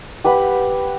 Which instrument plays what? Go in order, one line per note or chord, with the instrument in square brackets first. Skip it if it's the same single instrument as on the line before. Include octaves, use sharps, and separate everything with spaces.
[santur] G4 B4 F#5 B5